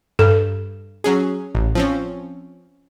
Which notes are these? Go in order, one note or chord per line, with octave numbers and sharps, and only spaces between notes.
G2 A4
F#3 C#4 G#4
A1
F3 C4 C#4